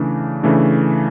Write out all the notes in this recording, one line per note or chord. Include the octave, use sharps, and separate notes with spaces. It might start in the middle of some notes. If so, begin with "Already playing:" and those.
Already playing: C#3 E3 A3 D4
C#3 E3 A3 D4